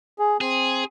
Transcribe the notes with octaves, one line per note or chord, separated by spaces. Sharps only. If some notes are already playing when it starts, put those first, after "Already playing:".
G#4
C4 G#4